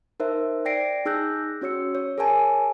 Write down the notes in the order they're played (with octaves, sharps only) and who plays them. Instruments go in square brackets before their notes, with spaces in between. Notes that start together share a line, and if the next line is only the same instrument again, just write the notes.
[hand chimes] D#4 A#4 C5 E5
D5 G5 A#6 C7 D7
D#4 G#4 E6 F#6 G6 A#6
C#4 F#4 C#5 E6 C#7
C#5
G#4 A#4 C#5 G#5 A5